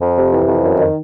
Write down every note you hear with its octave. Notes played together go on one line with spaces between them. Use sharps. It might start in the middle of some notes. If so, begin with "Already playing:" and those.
F2
C3
E3
F2
F#2
D#3